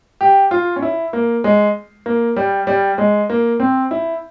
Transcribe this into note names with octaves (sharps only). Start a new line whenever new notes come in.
G4
F4
C#4
E4
A#3
G#3
A#3
G3
G3
G#3
A#3
C4
E4